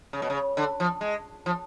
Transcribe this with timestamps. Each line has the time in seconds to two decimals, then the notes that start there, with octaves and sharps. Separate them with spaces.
0.13 C#3
0.22 B2
0.30 C#3
0.57 D3
0.80 F3
1.01 G#3
1.46 F3